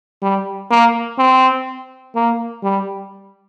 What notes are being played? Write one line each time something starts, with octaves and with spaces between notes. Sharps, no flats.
G3
A#3
C4
A#3
G3